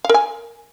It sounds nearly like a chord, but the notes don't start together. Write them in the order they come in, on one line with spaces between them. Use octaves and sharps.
F5 A#4 G#5